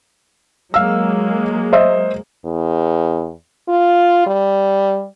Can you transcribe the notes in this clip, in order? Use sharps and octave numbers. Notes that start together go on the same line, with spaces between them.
F#3 G#3 A#3 F5 E6
C5 D#5 E5
E2
F4
G3